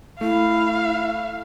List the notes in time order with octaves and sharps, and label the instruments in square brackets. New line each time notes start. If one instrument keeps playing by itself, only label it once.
[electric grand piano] A3 [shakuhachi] E4 [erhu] F5